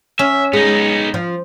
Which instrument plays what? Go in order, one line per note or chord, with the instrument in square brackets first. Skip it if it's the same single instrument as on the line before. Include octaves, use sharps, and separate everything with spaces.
[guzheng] C#4 [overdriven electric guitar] E5
[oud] G#3 [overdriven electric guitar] B3 D#4
[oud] F3